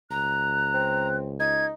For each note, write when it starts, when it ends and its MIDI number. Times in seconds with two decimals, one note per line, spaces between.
0.11 1.72 37
0.11 1.08 82
0.11 1.17 90
0.74 1.34 60
1.40 1.73 63
1.40 1.66 92